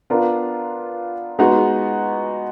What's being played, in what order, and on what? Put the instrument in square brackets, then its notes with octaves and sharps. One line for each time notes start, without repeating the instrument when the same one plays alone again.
[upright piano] B3 D4 F4 A#4
G#3 B3 D#4 F#4